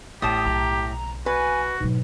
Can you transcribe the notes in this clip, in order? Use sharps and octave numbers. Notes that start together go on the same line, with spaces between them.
A1 A2 G4 A5 D#6
B1 C#3 A#5
F#4 B4 G#5
G#2 B2 F#3